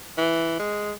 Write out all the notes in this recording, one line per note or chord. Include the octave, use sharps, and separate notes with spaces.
E3
G#3